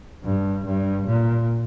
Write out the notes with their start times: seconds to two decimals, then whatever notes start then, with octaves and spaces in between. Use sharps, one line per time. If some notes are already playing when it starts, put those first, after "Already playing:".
0.24 G2
0.65 G2
1.06 A#2